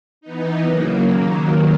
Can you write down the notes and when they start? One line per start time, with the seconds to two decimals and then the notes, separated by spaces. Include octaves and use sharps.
0.21 E3 B3 D#4
0.64 C#3 F#3 A#3
1.07 D#2 D#3 F#3 A#3